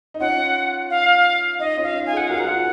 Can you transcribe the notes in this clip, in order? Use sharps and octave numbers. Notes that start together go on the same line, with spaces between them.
D#4
C#4 F4 F#5
F5
D#4 D#5
C#4 F4
F5
D#4
G#5
F4 G#4
F#5
F#4 A#4 F5
A#4 F#5
F4 G#4